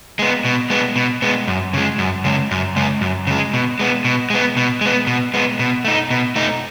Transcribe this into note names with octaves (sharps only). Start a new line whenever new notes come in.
G#3 B3
B2
G#3 B3
B2
G#3 B3
F#2
C#3 G#3
F#2
C#3 G#3
F#2
C#3 G#3
F#2
C#3 G#3
B2
G#3 B3
B2
G#3 B3
B2
G#3 B3
B2
G#3 B3
B2
A3 D#4
B2
A3 D#4